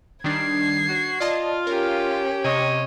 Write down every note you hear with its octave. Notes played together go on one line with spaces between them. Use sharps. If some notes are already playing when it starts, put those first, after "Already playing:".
D#3 G3 D4 G#6 C7
F#4
F4 D5 D#5 A5
C#4 G4 A#4
C3 C#5 D#5